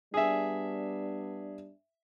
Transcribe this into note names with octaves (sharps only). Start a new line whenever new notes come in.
G3 B3 D4 G#4 E5